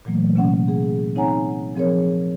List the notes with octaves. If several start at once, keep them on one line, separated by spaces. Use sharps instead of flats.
A#2 E3 F#3 A3 A#3
C3 A#3 C#4 F#5
G#4
C4 D#4 C#5 F#5 G#5 A#5
F3 C4 G#4 A#4 C#5